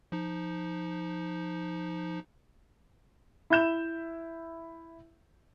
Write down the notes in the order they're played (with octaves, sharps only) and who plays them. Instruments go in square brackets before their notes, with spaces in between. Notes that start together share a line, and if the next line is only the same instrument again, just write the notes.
[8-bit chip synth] F3 D#4
[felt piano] E4 E5 G6 E7